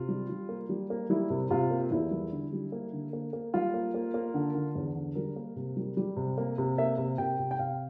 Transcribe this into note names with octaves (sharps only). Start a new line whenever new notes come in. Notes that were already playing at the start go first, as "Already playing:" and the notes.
Already playing: C3 F4
G3
G3
A#3
G3
A#3
G3 E4
C3
C3 F4
A#3
E2 E4
G3
D3
G3
A#3
D3
A#3
A#3
G3 F4
A#3
A#3
A#3
D3
D3
E2
D3
G3 A#4
A#3
C3
G3
G3
C3
A#3
C3
A#3 E5
C3
C3 G5
C3
G5
C3 F5